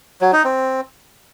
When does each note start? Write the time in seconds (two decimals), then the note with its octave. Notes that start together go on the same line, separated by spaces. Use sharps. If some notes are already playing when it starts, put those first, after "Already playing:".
0.21 F#3
0.33 D#4
0.44 C4